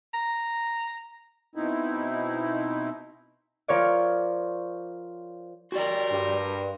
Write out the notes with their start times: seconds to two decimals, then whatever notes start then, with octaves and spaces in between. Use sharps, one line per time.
0.14 A#5
1.55 B2 C4 D#4 E4
3.68 F3 A#4 C#5 D5
5.72 F#4 G4 A#4 D5 C6
6.12 G2